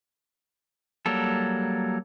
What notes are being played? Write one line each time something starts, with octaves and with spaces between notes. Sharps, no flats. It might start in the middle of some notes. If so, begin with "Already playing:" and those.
F#3 G3 A#3 A4